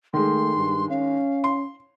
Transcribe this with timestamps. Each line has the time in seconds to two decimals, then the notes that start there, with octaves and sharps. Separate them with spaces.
0.14 D#3 G#3 A3 C6
0.56 G2
0.90 C#4 F5
1.44 C6